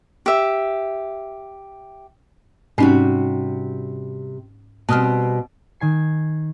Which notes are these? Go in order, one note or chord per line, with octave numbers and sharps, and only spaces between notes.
G4 E5
G#2 C3 G3 C#4 D#4 F#4
B2 G3 C4 A5 D#6 F6
D#3 G#5 C7